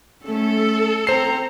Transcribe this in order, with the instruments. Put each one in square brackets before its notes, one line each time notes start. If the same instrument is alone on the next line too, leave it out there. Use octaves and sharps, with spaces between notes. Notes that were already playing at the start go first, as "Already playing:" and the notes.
[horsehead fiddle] A3 C#4 [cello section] A4
[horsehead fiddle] C4 A#5 [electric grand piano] C5 C7